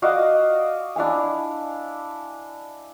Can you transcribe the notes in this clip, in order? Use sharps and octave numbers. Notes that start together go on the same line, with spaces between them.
F#4 D5 D#5 F5
D4 E4 F5 G#5